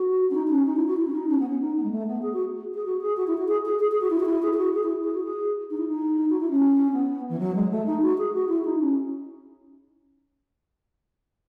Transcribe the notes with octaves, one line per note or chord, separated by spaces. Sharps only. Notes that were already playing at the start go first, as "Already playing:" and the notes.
Already playing: F#4
C#4
D#4
D#4
C#4
D#4
E4
F#4
E4
C#4
D#4
C#4
B3
C#4
D#4
B3
G#3
A3
B3
G#4
F#4
G#4
F#4
G#4
F#4
E4
F#4
G#4
G#4
G#4
G#4
F#4
E4
F#4
E4
G#4
G#4
F#4
G#4
E4
G#4
F#4
G#4
D#4
E4
D#4
F#4
E4
C#4
B3
E3
F#3
G#3
A3
D#4
F#4
G#4
F#4
E4
D#4
C#4